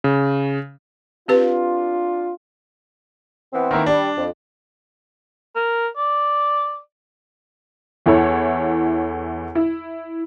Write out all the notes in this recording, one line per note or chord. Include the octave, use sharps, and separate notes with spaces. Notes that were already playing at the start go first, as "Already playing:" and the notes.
C#3
C4 D4 F4 G4 B4
E3 B3 C4
D#3 A#3 E4
G3 D4
F2
A#4
D5
E2 E4 A4 C#5
E4